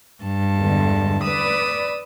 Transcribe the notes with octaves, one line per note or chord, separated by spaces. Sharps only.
G2 A5
E2 D3 G#3
B4 D5 D#6 E6